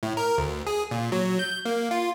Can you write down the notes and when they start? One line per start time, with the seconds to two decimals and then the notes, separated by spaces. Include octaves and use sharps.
0.03 A2
0.17 A#4
0.38 D2
0.67 G#4
0.91 A#2
1.12 F#3
1.39 G6
1.65 A#3
1.91 F4